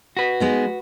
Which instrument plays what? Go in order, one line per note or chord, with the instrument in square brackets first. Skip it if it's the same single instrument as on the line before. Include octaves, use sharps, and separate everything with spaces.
[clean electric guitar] F#4 B4
[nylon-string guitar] G#3 B3 D#4